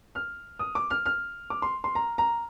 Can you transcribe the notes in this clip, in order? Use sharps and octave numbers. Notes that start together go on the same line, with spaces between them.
F6
D#6
D6
F6
F6
D6
C6
C6
A#5
A#5